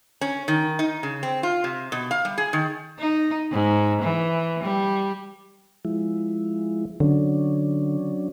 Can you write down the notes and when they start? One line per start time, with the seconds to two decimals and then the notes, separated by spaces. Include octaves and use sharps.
0.21 C#4
0.48 D#3
0.79 D#4
1.03 C#3
1.23 C4
1.43 F4
1.64 C3
1.92 B2
2.11 F5
2.25 G3
2.38 G#4
2.53 D#3
2.99 D#4
3.52 G#2
4.02 E3
4.63 G3
5.85 F3 G#3 E4
7.00 D3 F#3 C#4 D4